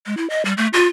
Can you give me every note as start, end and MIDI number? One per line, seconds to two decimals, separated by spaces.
0.06 0.14 56
0.17 0.29 64
0.30 0.44 75
0.45 0.53 55
0.57 0.67 57
0.73 0.87 65